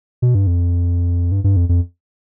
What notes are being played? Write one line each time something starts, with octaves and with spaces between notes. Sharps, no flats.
B2
G2
F2
G2
G2
F2
F2